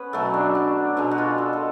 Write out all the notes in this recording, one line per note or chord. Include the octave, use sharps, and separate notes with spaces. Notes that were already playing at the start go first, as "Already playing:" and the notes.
Already playing: B3 C#4 B4
B2 F#3 A3 A4
D4
D4
B2 G#3 D4
F#4
F4
A4
A4